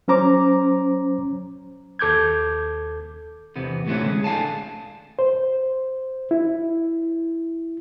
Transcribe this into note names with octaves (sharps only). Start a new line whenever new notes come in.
F#3 C#4 C5 A#5 D6
D#2 A4 D6 G6 G#6
E2 C3 B3
D2 A2 C3 E3 B3 C#4
G#3
D2 D3 F5 G#5 A5
C5
E4